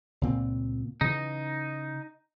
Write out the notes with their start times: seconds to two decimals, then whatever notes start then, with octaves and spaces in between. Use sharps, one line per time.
0.21 C#2 A#2 C4
1.01 C#3 E3 D#4